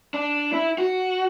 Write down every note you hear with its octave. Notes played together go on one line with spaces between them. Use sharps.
D4
E4
F#4